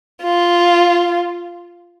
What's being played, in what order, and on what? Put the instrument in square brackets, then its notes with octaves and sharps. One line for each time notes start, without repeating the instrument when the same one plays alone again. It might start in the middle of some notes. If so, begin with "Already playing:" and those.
[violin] F4